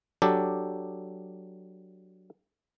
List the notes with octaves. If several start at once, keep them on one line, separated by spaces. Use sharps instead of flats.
F#3 D4 G4 A4